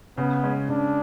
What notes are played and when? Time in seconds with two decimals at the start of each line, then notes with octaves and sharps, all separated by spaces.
0.17 C#3 B3
0.43 G#3 C#4
0.69 C#3 D4